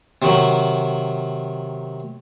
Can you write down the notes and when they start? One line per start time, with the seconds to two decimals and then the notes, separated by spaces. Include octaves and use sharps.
0.22 C3 D#3 F#3